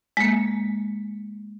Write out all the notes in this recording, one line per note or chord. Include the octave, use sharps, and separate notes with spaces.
G#3 A#3